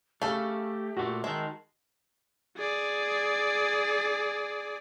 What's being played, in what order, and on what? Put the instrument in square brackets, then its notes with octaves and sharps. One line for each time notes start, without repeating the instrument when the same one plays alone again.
[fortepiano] C#3 [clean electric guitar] A3 [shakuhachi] G4 [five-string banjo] A4 F5
[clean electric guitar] A#2 A3 [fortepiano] F#4
[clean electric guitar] D#3 G#3 [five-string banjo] E5 [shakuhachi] A5
[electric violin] G#4 D5